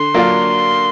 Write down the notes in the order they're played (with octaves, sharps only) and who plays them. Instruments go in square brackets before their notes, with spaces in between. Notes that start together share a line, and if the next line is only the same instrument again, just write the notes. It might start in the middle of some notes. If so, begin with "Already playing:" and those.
Already playing: [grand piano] D3 [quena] C6
[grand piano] F#3 A#3 D4 F4